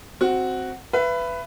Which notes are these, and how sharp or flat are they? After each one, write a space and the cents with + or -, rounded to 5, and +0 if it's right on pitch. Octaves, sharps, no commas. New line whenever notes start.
C4 +0 F#4 +0
B4 +10 E5 +35